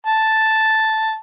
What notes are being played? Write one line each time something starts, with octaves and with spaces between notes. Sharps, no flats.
A5